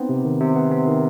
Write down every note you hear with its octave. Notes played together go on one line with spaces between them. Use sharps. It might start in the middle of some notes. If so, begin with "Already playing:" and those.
Already playing: B3 C4 D#4
C3
D#3
C3
B3
C3
D#3